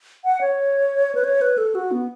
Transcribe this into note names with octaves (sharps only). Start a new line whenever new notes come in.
F#5
C#5
B4
C#5
B4
A4
F#4
B3